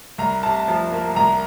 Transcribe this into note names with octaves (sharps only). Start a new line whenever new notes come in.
C2 A#5
C3 A5
F3
A#3
C2 A#5